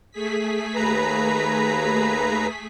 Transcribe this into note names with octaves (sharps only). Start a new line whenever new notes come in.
A3 G#4 B6
D#2 B4 A#5